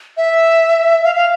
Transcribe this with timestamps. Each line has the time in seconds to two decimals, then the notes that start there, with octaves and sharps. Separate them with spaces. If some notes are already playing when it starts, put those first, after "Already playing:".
0.17 E5
1.04 F5
1.15 F5